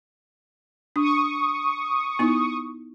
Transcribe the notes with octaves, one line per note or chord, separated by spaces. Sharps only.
D4 C#6 D#6
B3 D#4 E4